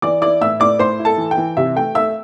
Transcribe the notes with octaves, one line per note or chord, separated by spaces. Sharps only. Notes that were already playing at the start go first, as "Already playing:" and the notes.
E3 D5 D6
E4 D5 D6
A2 E5 E6
A2 D5 D6
A2 C5 C6
E4
A4 A5
E3
G5
E3
C3 E5
A3 G5
A3 E5 E6